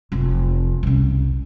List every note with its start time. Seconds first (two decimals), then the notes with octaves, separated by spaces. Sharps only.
0.12 F1 F3
0.83 C2 C#3